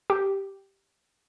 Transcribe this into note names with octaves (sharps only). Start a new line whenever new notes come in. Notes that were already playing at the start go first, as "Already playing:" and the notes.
G4